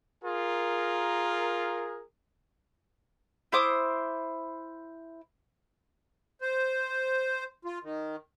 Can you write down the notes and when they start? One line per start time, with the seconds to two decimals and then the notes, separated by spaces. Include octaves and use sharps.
0.24 F4 G#4 A#4
3.52 E4 C5 D6 D#6
6.41 C5
7.65 F4
7.83 D#3